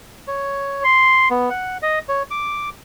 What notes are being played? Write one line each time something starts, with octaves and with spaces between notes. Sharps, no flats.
C#5
C6
B3
F#5
D#5
C#5
D6